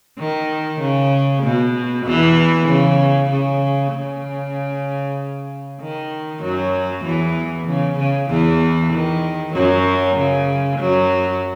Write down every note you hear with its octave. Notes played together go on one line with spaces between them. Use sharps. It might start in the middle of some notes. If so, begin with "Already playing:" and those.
D#3
C#3
B2
E2 E3
C#3
C#3
C#3
D#3
F#2 F#3
E2 E3
C#3
C#3
E2 E3
D#3
F#2 F#3
C#3
F#2 F#3